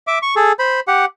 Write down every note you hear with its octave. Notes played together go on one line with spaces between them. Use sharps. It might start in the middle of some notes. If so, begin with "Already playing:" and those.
E5 D6
C#6
G#4 A4
C5 B5
G4 F#5